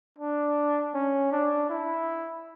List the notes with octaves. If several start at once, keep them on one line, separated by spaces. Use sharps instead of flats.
D4
C#4
D4
E4